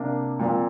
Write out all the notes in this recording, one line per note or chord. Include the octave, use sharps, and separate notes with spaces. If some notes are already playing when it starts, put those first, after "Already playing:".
Already playing: C3 A#3 D4
A#2 F3 C4